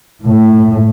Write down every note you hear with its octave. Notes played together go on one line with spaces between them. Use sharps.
A2